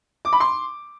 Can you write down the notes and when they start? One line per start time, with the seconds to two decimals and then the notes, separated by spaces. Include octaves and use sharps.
0.25 D6
0.33 B5
0.40 C6